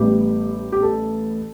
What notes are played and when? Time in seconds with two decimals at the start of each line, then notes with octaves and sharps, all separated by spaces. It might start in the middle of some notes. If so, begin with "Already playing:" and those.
Already playing: A1 A2 G3 B3 G4
0.72 G4
0.82 A4